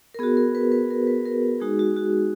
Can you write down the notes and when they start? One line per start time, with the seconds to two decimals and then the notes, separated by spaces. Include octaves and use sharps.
0.14 A#4
0.19 B3 G#4
0.23 F#4
0.37 A#4
0.55 B4
0.72 B4
0.91 A#4
1.07 B4
1.26 A#4
1.60 G#3 D#4 F#4 G#4
1.79 F#4
1.97 F#4